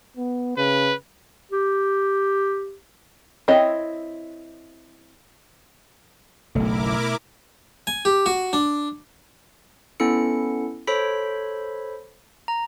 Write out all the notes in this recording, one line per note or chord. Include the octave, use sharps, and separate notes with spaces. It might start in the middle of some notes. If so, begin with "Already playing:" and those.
B3
C#3 B4
G4
C4 E4 C#5 D#5
F#1 B1 B2 A3 E4 A#4 D6
G#5
G4
F#4
D4
B3 C#4 E4 A4 C#7
A4 C5 C#5 B5 B6
A#5